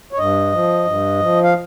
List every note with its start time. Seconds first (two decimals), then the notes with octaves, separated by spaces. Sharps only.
0.13 C#5
0.18 G2 D#5
0.52 F3
0.86 G2
1.20 F3
1.44 F5